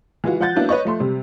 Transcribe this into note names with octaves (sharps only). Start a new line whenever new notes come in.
E3 G#3 F4 F#4
F3 F#5 F#6 G6 A6
F#3 A#3 B3 D4 E4
B4 C#5 D#5 C#6
F3 A3 C6
C3 G3